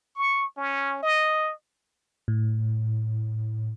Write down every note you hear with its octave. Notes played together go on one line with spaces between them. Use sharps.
C#6
C#4
D#5
A2